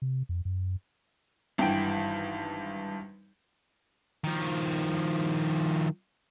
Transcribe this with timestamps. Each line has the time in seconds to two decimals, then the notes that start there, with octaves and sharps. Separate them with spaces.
0.02 C3
0.29 F2
0.45 F#2
1.58 G#1 G2 E3 G5 D7
4.24 D#3 F3